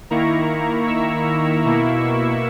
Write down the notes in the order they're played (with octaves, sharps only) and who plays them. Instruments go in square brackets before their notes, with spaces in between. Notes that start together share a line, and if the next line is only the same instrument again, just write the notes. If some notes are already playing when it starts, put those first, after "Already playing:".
[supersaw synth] D#3 A#3 E4 A#5 C#6
C#6 E6
B2 A#3 E4